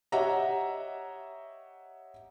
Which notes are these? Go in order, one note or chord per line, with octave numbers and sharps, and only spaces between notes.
G4 C#5 D#5 E5 F#5 A#5